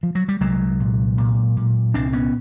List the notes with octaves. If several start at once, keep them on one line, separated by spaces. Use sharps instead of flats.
F3
F#3
G3
C2 F#3 G#3
A#2
A#2
A#2
C2 C4 D4
B3 C#4